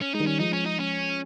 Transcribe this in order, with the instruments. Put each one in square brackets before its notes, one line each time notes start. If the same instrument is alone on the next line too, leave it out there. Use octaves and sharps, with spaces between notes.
[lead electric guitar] C#4
[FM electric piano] G#3 [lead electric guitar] D#4
[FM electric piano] D#3 G3
[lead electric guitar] C#4
[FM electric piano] F3 G#3 [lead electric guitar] D#4
[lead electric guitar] C#4
D#4
C#4